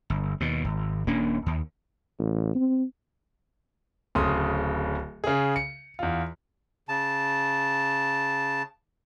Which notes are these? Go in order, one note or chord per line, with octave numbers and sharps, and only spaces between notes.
G1
D#2 B2
G#1
D#1 A#3 C#4 D4
D#2
A1
C4
D1 C#3 C6 D#6
C#3 G#4
C#7
E2 F4
C#3 A5